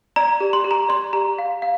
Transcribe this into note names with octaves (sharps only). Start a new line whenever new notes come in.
D5 A#5
G4
C6
G4
A#5
D5 C6
G4 A#5
F5
F5